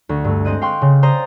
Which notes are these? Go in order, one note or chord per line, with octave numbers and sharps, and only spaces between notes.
D2 C#6
G2 A3
G#3 C4 D#5 F#6 D#7
F5 G5 C6 C#6 F#6
C#3
C5 D5 A#5 D#6